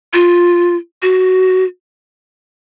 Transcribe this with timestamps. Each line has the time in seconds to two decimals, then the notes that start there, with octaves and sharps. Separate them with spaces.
0.14 F4
1.02 F#4